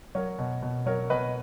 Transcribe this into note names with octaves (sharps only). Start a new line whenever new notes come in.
F#3 A#4 C#5
B2
B2
F#3 A#4 C#5
B2 B4 D#5